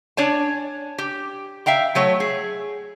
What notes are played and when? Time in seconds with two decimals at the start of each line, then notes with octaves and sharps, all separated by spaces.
0.17 D4 C#5 G#5 A5
0.98 G4
1.66 E5 F5 G5 A#5
1.95 F#3 A3 C#5
2.20 G#4